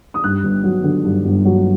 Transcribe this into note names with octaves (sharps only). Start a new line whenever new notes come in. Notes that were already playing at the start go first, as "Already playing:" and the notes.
D#6
G2 F#6
G1
F#3
D3
G2
G1
F#3